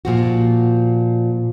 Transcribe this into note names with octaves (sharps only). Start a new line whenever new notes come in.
A#2 F3 F#4